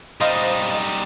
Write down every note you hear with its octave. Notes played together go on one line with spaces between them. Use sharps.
G3 D#4 C5 D#5 F5